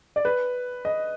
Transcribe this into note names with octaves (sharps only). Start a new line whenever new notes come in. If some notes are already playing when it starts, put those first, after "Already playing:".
D5
B4
D#5